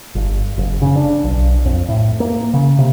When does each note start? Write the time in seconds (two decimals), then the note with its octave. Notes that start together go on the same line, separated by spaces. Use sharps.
0.15 G1
0.58 F#1
0.82 C#3
0.97 D4
1.24 B1
1.65 F2
1.88 A2
2.20 A#3
2.54 C#3
2.79 C3